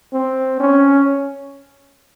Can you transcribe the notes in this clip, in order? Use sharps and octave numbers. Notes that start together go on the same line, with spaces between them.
C4
C#4